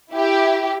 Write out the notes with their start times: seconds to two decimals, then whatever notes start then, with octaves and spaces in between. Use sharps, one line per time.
0.12 E4 G4